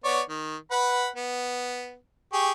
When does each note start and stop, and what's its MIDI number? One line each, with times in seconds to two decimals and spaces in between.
0.04 0.21 59
0.04 0.21 73
0.04 0.21 74
0.29 0.56 51
0.71 1.09 71
0.71 1.09 78
0.71 1.09 83
1.16 1.96 59
2.33 2.52 67
2.33 2.52 68
2.33 2.52 85